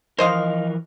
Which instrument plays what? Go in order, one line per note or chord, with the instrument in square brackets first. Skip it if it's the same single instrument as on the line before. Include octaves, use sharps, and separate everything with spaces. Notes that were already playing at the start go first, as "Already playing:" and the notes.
[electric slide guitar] E3 F3 A#4 [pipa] C5 D#5 F5